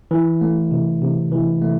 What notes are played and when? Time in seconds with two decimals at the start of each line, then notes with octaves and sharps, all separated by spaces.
0.11 E3
0.41 A3
0.71 C3
1.02 C3
1.32 E3
1.61 A3